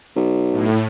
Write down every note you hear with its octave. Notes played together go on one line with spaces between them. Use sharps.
B1
A2